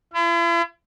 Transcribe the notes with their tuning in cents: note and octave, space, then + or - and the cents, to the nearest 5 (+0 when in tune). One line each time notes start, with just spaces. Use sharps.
E4 +45